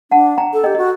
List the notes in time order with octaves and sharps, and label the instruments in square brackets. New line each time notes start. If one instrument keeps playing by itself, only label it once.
[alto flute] D4 [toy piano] F#5 A5
[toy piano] G5 A#5
[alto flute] A4
[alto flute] G4 [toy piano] D#5 G5
[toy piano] D#5
[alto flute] F#4